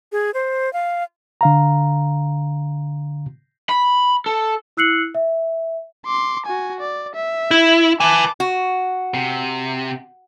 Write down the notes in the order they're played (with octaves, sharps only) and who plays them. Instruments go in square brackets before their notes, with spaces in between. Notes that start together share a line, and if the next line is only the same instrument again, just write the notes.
[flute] G#4
C5
F5
[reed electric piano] D3 F5 A#5
[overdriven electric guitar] B5
A4
[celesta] E4 E6 F#6 C7 C#7 F#7
E5
[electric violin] C6 D6
F#4 G#5
D5
E5
[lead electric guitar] E4
[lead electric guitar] B4 G#5 [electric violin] A5 D6
[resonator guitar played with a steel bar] F#4
[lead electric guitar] C3